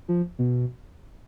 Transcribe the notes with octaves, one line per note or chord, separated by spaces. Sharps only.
F3
B2